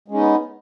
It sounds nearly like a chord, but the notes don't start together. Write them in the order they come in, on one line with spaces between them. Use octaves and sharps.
G#3 C#4 D#4 B3